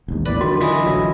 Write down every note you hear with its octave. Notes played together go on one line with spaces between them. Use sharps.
E1 D#2
A#1 E2 A2 B4 D5 B5
D3 D#3 F#3 F#4
E3 E4 F4 D#5
A1 D2 F#3 F#4